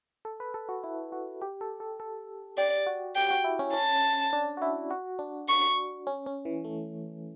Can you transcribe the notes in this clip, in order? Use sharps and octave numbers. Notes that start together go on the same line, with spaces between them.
A4
B4
A4
F#4
E4
F#4
G4
A4
A4
A4
G4 D5
F#4
G4 G5
F#4
E4
C#4
C#4 A5
D4
F#4
E4
F#4
D4
C#6
C#4
C#4
E3
A3